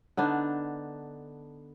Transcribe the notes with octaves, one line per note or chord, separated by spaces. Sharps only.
D3 B3 D4 D#4